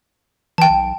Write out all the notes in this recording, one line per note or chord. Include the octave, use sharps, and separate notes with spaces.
E3 G5 A5
B1